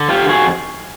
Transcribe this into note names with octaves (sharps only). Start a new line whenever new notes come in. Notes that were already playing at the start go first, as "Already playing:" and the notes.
Already playing: D3
F2 F4 G4
F2 F#4 G#4